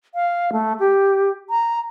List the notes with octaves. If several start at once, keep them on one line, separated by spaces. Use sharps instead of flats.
F5
A3
G4
A#5